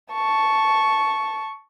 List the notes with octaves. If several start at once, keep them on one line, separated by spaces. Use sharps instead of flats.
A5 C#6